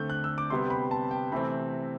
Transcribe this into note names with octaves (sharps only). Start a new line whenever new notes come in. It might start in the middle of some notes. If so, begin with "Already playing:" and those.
Already playing: D3 A3 C4 G6
F#6
E6
D6
C3 G3 B3 C6
B5
A5
G5
C3 E3 A3 C4 B5